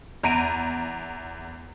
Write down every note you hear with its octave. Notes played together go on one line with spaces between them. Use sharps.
E2 A#5 D7 D#7